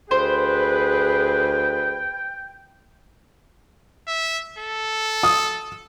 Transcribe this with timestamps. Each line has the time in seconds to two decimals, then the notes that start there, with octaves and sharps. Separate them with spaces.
0.11 D2 G#4 B4 C5 G5
4.08 E5
4.59 A4
5.23 D#6